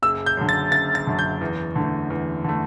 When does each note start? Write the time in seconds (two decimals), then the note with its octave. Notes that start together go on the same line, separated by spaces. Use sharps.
0.02 F#1 E6
0.26 G6
0.37 F#2 D3
0.49 A6
0.71 F#1 A6
0.95 A6
1.07 F#2 D3
1.19 G6
1.41 E2
1.76 D3 A3
2.10 E2
2.44 D3 A3